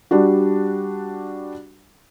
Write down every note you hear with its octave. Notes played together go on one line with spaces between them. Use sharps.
G3 D4 F#4